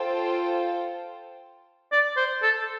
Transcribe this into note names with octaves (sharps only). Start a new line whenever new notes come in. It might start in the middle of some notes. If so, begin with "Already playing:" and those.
Already playing: F4 A4 C5 G5
D5
C5
A4